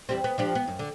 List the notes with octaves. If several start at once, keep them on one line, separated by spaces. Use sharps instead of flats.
E2 G3 C4
B3
F3 D4 G4
B3
F#2
D3